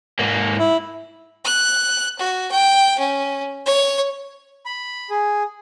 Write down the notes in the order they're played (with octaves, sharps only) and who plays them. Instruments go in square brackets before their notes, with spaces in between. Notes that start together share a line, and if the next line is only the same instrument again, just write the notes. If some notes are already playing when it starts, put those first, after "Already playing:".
[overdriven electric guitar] G#2 A#3
[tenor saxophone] E4
[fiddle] F#6
F#4
G5
C#4
C#5
[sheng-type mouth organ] B5
G#4